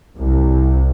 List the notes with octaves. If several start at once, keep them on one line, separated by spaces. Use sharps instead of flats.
C2